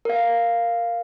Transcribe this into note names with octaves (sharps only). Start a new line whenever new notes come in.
A#4 F5